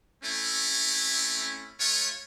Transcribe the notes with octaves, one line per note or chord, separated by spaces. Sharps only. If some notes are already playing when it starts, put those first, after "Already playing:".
A3 C4 C#4 E4
A3 F4 C#5